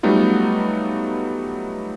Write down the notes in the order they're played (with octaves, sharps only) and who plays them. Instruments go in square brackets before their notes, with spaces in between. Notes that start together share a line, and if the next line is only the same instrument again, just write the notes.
[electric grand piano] F#3 G3 A3 B3 D#4 F4